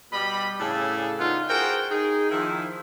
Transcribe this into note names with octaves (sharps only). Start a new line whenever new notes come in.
B2 G3 D#5 B5
A2 C#3 D4 G#4 A4
B3 D#4 F4
F#4 G#4 A#4 C5 G5
D#4 G#4
D#3 F3 E4